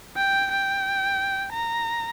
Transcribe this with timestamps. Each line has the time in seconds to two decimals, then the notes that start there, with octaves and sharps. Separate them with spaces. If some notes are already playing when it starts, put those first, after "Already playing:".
0.16 G5
0.51 G5
1.53 A#5